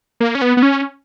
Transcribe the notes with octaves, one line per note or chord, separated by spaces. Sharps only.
A#3
C#4
B3
B3
C#4